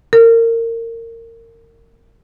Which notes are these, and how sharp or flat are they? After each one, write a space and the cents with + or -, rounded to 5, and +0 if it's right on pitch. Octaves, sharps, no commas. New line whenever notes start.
A#4 -25